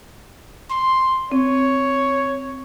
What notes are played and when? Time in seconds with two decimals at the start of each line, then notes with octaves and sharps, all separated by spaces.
0.70 C6
1.32 C4 C#5